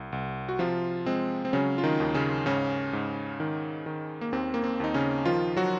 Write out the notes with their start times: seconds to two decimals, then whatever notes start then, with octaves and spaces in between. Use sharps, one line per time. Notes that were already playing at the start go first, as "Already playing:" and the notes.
Already playing: C2
0.12 C2
0.49 F#4
0.59 C3 F3 F4
1.06 G#3 C4
1.45 C4
1.53 C#3 F#3 C#4
1.78 F4
1.83 D#3 D#4
2.00 D#2
2.14 C#3 C#4
2.46 G#2 C#3 C#4
2.93 G#2
3.40 D#3
3.86 D#3
4.21 A#3
4.32 D#2 C4
4.54 A#3
4.64 C4
4.80 D#2 D#4
4.94 C#3 C#4
5.25 D#3 F3 F4
5.57 F#3 F#4